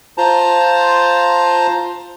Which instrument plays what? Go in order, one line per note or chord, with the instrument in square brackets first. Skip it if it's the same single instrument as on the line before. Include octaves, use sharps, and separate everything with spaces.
[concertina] F4 C5 A5 A#5